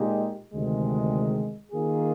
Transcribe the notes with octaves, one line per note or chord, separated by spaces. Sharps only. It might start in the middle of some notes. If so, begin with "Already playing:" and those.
Already playing: A#2 G#3 D#4 G4
D2 C3 D#3 G#3
D#3 A#3 F4 G#4